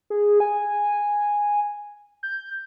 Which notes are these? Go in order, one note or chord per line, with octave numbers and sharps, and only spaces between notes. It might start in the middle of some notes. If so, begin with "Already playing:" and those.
G#4
G#5
G6